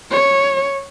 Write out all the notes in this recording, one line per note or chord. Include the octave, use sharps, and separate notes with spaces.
C#5